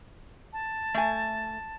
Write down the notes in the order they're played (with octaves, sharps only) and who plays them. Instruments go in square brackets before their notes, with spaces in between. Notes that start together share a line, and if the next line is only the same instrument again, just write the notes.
[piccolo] A5
[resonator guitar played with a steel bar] A3 G#5